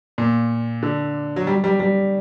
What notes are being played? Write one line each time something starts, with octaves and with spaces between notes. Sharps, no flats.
A#2
D3
F#3
G3
G3
G3